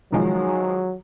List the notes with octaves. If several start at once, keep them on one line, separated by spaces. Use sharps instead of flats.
D#3 F3 F#3 G#3